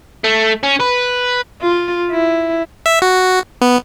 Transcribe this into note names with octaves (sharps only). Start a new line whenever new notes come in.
A3
C#4
B4
F4
E4
E5
F#4
B3